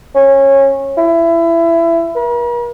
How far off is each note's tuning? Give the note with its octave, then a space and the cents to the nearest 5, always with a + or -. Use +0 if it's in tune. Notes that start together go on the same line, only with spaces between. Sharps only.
C#4 -20
E4 +20
A#4 +45